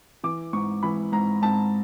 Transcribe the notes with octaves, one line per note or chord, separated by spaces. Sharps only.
E3 D6
G#2 C#6
E3 B5
G#2 A#5
G#2 A5